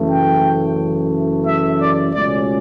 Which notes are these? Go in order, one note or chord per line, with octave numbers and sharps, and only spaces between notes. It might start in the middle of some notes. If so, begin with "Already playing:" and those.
Already playing: F#2 C#3 E3 A3
G5
E5
D5
C#2 B2 A3 C#4 D5